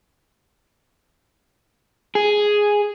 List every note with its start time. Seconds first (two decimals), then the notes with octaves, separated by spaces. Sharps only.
2.15 G#4